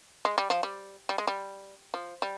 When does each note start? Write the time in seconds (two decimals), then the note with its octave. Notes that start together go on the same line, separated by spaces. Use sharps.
0.25 G#3
0.38 G3
0.50 F3
0.63 G3
1.09 G3
1.18 G#3
1.27 G3
1.94 F3
2.22 G3